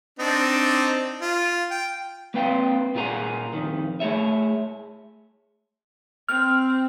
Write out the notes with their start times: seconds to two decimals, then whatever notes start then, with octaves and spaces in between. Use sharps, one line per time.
0.19 C4 D4 D#4
1.22 F4
1.71 G5
2.34 A#3 C4 B4 F5 G5
2.95 A#2 F4 G#4 A#4 C#5 F#5
3.53 F2 D#3
4.00 A3 G#4 C#5 E5
6.29 C4 F6